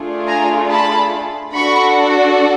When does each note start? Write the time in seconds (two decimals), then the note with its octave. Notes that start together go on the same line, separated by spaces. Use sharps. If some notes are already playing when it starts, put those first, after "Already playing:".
Already playing: A3 D4 F4 G#4
0.28 G#5 A#5
0.70 A5 B5
1.53 D4 F#4 A4 B5 C#6